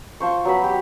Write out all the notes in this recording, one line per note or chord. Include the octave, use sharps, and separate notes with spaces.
F3 C5 C#6
F#3 B3 B5
G4